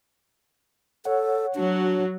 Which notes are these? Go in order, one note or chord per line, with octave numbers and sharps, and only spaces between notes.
A4 C#5 F#5
F#3 D4 F#4